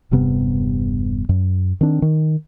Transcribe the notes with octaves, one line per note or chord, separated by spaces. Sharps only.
E1 G2 C3 B3
F#2
D#3 C4 D4
D#3